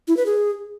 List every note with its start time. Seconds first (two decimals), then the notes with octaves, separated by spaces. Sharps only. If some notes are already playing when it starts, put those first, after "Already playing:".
0.08 E4
0.17 B4
0.26 G#4